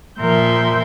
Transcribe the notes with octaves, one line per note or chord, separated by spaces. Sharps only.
A#2 F3 A#4 E5 C6 G6